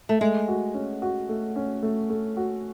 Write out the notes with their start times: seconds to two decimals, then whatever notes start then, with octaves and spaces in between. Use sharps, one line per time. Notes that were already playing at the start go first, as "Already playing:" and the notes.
0.09 A3
0.21 G#3 A3
0.48 F#4
0.74 C#4
1.02 F#4
1.29 A3
1.56 C#4
1.83 A3
2.10 A3
2.37 F#4